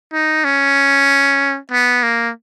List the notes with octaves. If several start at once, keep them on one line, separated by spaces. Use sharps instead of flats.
D#4
C#4
B3
A#3